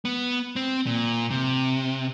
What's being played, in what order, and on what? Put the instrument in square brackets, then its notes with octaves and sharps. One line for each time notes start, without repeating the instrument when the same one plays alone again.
[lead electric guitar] B3
C4
A#2
C3